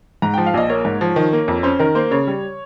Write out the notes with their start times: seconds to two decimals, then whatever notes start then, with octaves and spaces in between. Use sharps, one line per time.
0.22 G#2 A#5
0.34 F3 G5
0.46 F5
0.54 A#1 D#5
0.69 A#3 C#5
0.85 G#2
1.01 F3
1.16 D#3
1.33 A#3
1.48 F2
1.63 C#4 C5
1.79 D#3 A#4
1.95 A#3 C5
2.11 C#3 C#5
2.27 G3